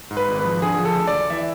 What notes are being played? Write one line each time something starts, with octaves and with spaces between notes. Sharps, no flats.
G#2
B4
G#1
B4
F3
D3 G#4
F3
A4
D2
D5
D2
E3 E5